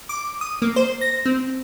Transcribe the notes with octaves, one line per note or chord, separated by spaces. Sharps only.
D6
D#6
A#3
C5
A#6
C4